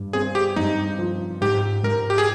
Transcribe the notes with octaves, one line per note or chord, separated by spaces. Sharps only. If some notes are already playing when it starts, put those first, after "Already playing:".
Already playing: G2
C4 G#4
G4
G2 D#4
F3
G#2 G4
G#2 A#4
G4
G#4